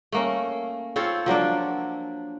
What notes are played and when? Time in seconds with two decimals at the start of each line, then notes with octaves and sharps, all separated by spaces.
0.12 A3 A#3 C#4
0.96 C4 F4 A4 C#5
1.26 F3 F#3 A#3 D4